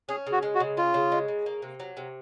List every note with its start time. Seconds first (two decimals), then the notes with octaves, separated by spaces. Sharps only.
0.09 C#4 G#4
0.27 C#3
0.32 F#4
0.42 G#3
0.55 F#4
0.60 C#3
0.77 C#4 F4
0.94 C#3
1.12 G#3
1.28 C#3
1.46 A#3
1.62 C3
1.80 F#3
1.97 C3